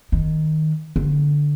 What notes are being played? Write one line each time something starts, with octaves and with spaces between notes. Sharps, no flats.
D#3
D3